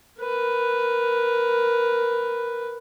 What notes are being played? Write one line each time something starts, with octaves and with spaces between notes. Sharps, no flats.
A#4 B4